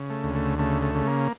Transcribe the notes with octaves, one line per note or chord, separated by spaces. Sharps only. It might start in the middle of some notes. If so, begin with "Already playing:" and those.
Already playing: C#3
A3
D2
A3
C#3 A3
A3
C#3
A#3